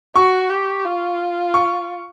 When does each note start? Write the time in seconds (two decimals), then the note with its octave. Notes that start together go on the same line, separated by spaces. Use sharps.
0.16 F#4 C#6
0.49 G4
0.85 F4
1.54 C#6